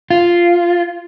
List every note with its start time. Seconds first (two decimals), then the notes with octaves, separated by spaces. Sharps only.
0.11 F4